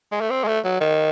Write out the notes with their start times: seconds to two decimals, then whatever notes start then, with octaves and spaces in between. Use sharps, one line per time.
0.12 G#3
0.21 A3
0.30 C4
0.44 G#3
0.48 A3
0.64 F#3
0.81 D#3